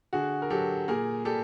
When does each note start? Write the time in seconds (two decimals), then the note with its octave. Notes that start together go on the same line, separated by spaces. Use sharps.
0.13 D3 F#4 G#4
0.42 A#4
0.50 F#3 G4 A4
0.88 A#2 G#4 A#4
1.25 G3 G4 A4